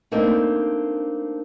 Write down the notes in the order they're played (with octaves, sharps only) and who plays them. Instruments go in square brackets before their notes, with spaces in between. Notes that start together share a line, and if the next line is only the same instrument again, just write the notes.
[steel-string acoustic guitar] A3 A#3 C4 D4 D#4